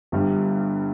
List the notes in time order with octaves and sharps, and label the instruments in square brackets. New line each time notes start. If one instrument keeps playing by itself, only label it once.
[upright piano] G1 G2 G3